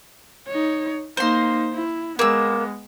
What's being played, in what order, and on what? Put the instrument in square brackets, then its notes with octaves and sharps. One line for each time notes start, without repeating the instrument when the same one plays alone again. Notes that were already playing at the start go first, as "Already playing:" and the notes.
[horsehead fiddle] D#4 C#5
[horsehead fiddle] A#3 D#4 [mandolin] C5 C6
[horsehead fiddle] E4
[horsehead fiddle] G#3 B3 [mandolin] A#3 E6